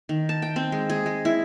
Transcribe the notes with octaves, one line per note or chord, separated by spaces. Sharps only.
D#3
A5
G5
C4
G#3
G#4
G#3
E4